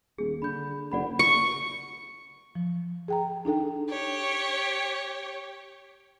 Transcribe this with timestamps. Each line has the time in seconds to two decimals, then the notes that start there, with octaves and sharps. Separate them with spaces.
0.18 D#1 G#4
0.42 D3 B5 G6
0.92 F#1 D5 F#5 B5
1.19 C#6
2.55 F3
3.08 G#4 G5 A#5
3.45 D4 D#4 A4 G5
3.89 G4 C#5